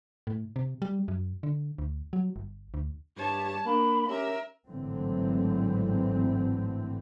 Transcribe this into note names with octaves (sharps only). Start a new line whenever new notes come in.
A2
C3
G3
F#2
D3
D2
F#3
G1
D2
G2 G4 C#5 A5
A#3 D4 B5
C#4 G4 A#4 E5
G#1 A2 D3 E3 F#3 C4